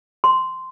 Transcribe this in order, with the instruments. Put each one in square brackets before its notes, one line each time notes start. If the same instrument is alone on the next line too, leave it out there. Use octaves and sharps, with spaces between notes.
[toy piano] C6